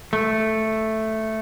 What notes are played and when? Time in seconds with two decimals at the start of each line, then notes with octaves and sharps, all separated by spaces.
0.13 A3